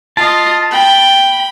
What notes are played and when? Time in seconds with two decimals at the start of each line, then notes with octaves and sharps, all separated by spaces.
0.17 F4 D#5 A5
0.72 G5 B5